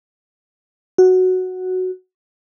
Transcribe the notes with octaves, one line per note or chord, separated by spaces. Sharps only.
F#4